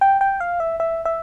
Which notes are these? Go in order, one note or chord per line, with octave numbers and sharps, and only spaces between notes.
G5
G5
F5
E5
E5
E5